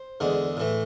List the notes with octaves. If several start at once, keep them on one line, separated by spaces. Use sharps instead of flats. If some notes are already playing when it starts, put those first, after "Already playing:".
Already playing: C5
E2 D3 G#3
A2 E3 A3